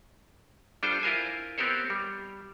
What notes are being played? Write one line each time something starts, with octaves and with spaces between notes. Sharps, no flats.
G3 D4 F4 A4 C5 G5
E4 F4 A#4 C5 G#5
B3 C4 G4 A#4 C5 C#5
G3